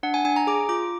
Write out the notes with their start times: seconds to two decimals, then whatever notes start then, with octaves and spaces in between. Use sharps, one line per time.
0.03 D4 F#5
0.14 G#5
0.25 D4 G#5
0.36 A#5
0.47 G#4 D6
0.69 F4 D6